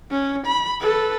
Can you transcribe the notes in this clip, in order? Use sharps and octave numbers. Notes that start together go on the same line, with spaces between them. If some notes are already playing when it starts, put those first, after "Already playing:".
C#4
B5
A4 B4